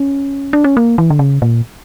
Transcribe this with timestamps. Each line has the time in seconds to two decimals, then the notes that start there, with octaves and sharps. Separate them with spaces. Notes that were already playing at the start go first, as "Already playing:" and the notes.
Already playing: C#4
0.53 D4
0.64 C#4
0.77 A#3
0.98 E3
1.10 D3
1.19 C#3
1.42 A#2